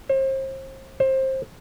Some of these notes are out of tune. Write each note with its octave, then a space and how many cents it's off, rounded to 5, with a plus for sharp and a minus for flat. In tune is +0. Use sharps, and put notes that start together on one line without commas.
C5 +35
C5 +20